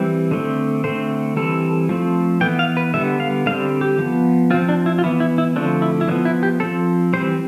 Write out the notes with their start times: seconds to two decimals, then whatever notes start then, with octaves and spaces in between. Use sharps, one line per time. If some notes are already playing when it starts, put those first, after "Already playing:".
Already playing: E3 G3 C4
0.31 D3 A3 C4
0.84 D3 A3 C4 C5
1.36 E3 G3 C4 A4
1.89 F3 A3 C4
2.41 E3 B3 G5
2.59 F5
2.77 B4
2.94 D3 G3 B3 E5
3.20 F5
3.46 D3 G3 C4 F5
3.81 G4
3.99 F3 B3
4.51 F3 C4 F4
4.69 D4
4.86 E4
4.99 F4
5.03 E3 B3 E4
5.20 E4
5.38 E4
5.56 D3 F3 A3 C4 D4
5.82 E4
6.01 E4
6.08 F3 B3 D4
6.25 E4
6.43 G4
6.60 F3 C4 A4
7.13 E3 G3 C4 C5